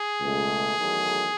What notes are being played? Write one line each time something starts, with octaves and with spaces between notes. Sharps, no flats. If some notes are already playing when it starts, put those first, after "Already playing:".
Already playing: G#4
C#2 B2 A3
E2 D#3 F#3 A3